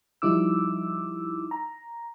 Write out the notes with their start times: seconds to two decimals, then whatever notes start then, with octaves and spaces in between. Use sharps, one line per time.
0.22 F3 G3 D#4 E4 D6 E6
1.51 A#5